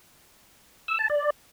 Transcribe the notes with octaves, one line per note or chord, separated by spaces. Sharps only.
E6
A5
D5